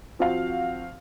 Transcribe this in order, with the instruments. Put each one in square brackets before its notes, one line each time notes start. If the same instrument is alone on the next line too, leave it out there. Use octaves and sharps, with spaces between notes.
[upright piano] F3 C4 F#4 C5 F5